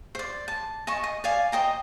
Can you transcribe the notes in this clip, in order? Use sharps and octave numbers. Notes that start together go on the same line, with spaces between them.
C5 D5
A5
D#5 G#5 A5 C#6
D#5
D5 F5 G#5
C5 D#5 G5 A#5